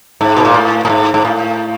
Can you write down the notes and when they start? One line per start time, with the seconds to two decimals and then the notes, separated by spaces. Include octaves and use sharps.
0.21 G#2
0.36 B2
0.45 A#2
0.54 A2
0.85 A2
0.90 G#2
1.14 G#2
1.25 A2